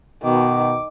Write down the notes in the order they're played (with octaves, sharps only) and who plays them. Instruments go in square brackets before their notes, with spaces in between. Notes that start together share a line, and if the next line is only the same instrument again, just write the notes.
[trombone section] B2 [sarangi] D#3 [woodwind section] D6